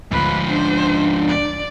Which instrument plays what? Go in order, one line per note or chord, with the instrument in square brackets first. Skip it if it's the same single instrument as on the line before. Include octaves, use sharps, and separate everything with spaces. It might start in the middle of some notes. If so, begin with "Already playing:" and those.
[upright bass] D2 [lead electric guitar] G#2 F3 [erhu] B4
[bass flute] D4 [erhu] C5
[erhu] D5